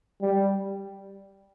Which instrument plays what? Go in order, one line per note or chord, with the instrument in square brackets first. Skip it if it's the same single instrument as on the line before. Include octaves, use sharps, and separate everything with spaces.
[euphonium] G3